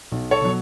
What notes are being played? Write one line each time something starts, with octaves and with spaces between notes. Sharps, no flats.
B1
A4 C#5
B2 F#3